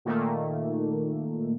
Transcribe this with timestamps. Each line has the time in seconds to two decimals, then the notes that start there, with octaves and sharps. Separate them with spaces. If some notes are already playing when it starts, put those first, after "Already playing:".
0.05 A#2 D#3 A3 A#3